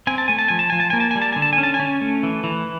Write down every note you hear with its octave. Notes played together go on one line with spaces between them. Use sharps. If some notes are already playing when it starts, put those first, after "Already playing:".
C4 G#5
A5
A3 G#5
A5
F3 G#5
A5
F3 G#5
A5
A#3 G#5
A5
G3 G#5
A5
D3 G#5
A5
G#5
C#4
A5
G#5
C#4
A3
E3
E3